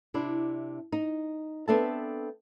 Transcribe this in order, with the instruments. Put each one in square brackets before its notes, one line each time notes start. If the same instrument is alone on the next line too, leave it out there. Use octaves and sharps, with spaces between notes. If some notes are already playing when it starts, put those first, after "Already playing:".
[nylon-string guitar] C3 D4 E4
D#4
B3 C4 D4 A4 E5 A5